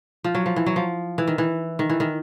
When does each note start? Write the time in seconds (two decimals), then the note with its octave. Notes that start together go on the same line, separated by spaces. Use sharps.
0.24 F3
0.35 F#3
0.46 F3
0.56 E3
0.66 F#3
0.76 F3
1.18 E3
1.28 D#3
1.38 E3
1.79 D#3
1.90 E3
2.00 D#3